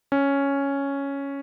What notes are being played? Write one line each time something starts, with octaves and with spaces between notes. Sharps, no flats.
C#4